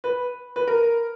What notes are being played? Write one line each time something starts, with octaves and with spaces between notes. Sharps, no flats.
B4
B4
A#4